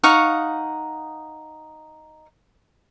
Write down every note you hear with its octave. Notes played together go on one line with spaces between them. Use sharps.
D#4 F5 F#5 C#6